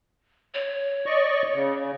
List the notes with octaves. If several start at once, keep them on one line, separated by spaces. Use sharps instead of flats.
C#5
D5 D#5 C#6
C#3